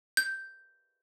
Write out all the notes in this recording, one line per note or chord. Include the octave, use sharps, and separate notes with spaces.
G6